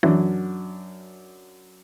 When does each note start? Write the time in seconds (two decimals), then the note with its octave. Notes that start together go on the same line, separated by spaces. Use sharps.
0.03 F#2 E3 D4